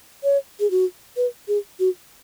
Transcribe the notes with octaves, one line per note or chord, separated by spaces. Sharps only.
C#5
G#4
F#4
B4
G#4
F#4